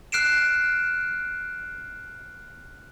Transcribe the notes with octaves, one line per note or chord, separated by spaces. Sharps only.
F6 F#6 C7 D7 E7